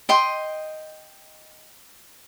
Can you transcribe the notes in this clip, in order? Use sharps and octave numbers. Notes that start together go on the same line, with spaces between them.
D#5 G5 C6